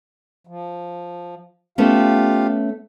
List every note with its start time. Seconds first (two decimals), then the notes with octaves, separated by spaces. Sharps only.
0.47 F3
1.78 A3 B3 C#4 F4 G4 F5